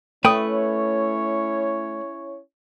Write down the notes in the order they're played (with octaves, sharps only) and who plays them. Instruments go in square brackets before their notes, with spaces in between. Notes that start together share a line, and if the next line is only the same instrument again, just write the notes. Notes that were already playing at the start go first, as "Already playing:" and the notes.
[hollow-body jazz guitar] A3 B4 [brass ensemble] C#4 E4 C#5 [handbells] G5 D#6